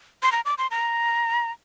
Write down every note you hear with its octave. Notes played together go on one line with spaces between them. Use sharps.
C6
A#5
D6
C6
A#5